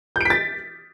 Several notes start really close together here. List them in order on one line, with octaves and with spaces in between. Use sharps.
G6 D7 B6 A6